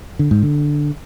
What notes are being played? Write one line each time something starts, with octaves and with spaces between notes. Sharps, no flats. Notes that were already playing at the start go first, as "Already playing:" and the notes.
D3
G#2
D3